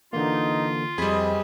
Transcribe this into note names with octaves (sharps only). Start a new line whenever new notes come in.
D3 E3 A#3 D#4 F4
F2 G3 C4 G#4 B4 D#5 G#5 B5